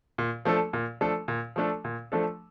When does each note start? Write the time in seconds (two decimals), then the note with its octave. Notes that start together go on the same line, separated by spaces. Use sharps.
0.18 A#2
0.45 F3 A3 D4 A4
0.73 A#2
1.01 F3 A3 D4 A4
1.28 A#2
1.56 F3 A3 D4 A4
1.85 A#2
2.12 F3 A3 D4 A4